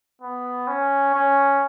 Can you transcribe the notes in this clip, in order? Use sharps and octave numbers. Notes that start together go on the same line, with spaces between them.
B3
C#4
C#4